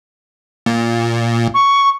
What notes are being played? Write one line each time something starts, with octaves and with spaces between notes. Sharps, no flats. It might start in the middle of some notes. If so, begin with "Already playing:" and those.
A#2
C#6